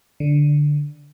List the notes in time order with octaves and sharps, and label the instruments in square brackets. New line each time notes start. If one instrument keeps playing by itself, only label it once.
[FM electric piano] D3